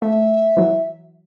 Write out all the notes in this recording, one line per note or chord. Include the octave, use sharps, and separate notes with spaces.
A3 E5
E3 F#3